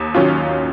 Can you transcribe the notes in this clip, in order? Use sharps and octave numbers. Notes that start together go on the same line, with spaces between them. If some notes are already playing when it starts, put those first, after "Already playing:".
Already playing: D#2
D#3 F#3 C#4 F4